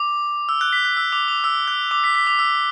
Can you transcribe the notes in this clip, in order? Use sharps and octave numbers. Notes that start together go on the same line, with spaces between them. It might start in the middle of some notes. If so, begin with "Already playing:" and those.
Already playing: D6
E6
F#6
B6
F#6
E6
D6
D6
E6
F#6
D6
B6
B6
D6
E6